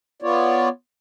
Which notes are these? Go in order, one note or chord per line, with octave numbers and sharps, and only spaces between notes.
B3 F4 C#5 D5